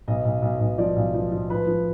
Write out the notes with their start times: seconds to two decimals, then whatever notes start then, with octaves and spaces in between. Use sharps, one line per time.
0.08 B1 D#5
0.25 B1
0.42 B1
0.60 B1
0.78 F3 D5
0.96 B1
1.14 F3
1.32 F3
1.50 F3 B4
1.67 F3